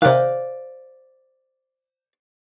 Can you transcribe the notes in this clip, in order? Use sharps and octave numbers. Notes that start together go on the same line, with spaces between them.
C3 D#3 C5 D5 F5 F#6